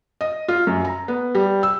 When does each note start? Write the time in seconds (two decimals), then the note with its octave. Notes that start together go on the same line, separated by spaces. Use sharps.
0.21 D#5
0.48 F4
0.67 F#2
0.85 A#5
1.08 B3
1.35 G3
1.63 E6